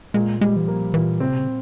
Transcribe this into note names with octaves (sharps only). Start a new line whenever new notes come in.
A#2 G#3
G3 G#3
E3
F3 A#3
A#2 E3
C#3 C4
C3
C#3